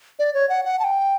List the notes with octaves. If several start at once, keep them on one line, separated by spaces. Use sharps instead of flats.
D5
C#5
F#5
F#5
A5
G5